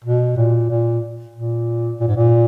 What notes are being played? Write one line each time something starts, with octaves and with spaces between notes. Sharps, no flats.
B2
A#2
A#2
A#2
A#2
G#2
A#2